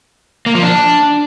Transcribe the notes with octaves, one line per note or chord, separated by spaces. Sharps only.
A#3
F3
D4